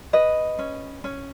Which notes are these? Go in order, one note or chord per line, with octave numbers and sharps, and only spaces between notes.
B4 D#5
C#4
C#4